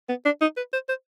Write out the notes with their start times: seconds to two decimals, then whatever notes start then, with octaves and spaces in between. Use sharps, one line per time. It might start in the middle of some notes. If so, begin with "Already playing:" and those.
0.09 B3
0.25 D4
0.41 D#4
0.57 B4
0.73 C5
0.89 C5